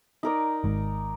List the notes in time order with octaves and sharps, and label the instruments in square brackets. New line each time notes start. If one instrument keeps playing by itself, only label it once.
[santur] D#4 A#4 D5
[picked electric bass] G#1 G#2